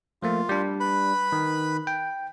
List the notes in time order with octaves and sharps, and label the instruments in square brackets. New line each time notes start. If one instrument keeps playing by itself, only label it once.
[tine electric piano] F3 A3 A#3 [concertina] F4
[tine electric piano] G3 D4
[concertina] B4 B5
[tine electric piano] D#3
G5